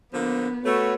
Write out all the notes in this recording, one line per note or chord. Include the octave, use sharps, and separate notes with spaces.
D3 F3 A#3 B3
A3 F#4 B4 C#5